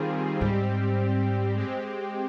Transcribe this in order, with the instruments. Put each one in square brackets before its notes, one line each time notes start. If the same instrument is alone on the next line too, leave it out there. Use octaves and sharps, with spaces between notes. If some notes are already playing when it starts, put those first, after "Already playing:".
Already playing: [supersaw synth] D#3 G3 C4 F4 G#4
[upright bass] G#2 [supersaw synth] G3 C4 G4
[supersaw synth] G#3 C4 G4